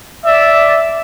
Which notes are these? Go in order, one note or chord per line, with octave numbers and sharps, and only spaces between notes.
D5 E5